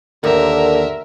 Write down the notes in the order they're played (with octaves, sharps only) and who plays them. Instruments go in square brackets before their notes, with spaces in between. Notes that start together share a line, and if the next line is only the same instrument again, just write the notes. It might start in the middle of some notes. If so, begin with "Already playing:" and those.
[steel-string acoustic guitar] D#2 [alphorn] D3 [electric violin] A#4 E5